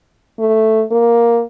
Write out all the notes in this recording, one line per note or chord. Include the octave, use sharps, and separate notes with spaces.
A3
A#3